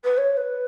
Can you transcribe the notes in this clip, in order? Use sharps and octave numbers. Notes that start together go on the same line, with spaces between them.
B4
C#5
C#5
B4